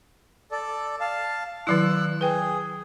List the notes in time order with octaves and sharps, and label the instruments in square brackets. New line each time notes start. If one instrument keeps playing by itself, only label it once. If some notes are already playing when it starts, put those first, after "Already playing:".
[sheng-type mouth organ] A4 D5
F5 A5
[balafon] D#3 F#3 E4 [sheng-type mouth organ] E6 F#6
[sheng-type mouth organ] G#4 [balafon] B4 G5